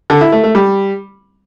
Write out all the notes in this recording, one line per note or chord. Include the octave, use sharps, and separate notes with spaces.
D3
E4
A3
A3
G3